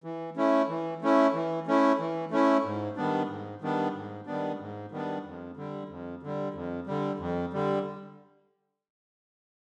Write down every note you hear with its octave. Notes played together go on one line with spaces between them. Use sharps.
E3
A3 C#4 E4
E3
A3 C#4 E4
E3
A3 C#4 E4
E3
A3 C#4 E4
G#2
D#3 G3 B3 D4
G#2
D#3 G3 B3 D4
G#2
D#3 G3 B3 D4
G#2
D#3 G3 B3 D4
F2
D3 G3
F2
D3 G3
F2
D3 G3
F2
D3 G3